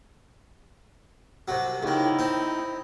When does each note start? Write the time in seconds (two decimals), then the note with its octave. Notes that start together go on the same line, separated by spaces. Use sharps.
1.48 C2 F#3
1.83 C#2 D#3 D#4 E4
2.19 C4